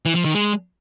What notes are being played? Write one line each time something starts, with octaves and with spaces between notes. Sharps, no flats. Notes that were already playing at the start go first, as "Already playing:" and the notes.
E3
F3
D#3
G#3